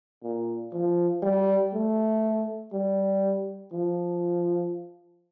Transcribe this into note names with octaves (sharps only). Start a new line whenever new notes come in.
A#2
F3
G3
A3
G3
F3